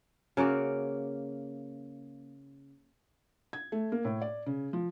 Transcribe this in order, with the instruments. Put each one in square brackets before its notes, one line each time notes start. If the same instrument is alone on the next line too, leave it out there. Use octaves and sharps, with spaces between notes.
[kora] C#3 A#3 F#4 D5
[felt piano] G#6
A3
A#3
A2
D5
C#3
F3